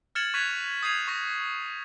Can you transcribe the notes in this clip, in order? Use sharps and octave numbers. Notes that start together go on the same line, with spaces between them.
F6 G#6 A6 C#7 E7 F#7
C#6 F#6 G#6 B6 D#7 F7
D#6 G6 G#6 C7 D#7 F7
C#6 A#6